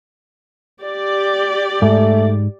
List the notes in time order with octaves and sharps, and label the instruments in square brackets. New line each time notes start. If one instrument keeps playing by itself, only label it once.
[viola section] G4 D5
[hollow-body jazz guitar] G#2 [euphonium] A3